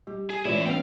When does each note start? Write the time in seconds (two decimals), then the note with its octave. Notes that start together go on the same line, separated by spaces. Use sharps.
0.07 G3 G4
0.30 G#4
0.45 A2 E3 G#3 C#4 E4 F4 C#5 D5
0.66 G3 B3 C4 D4 C#5 F5 G5